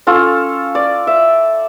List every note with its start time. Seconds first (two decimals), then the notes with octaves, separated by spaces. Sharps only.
0.07 C#4 F4 A4
0.75 D5
1.07 E5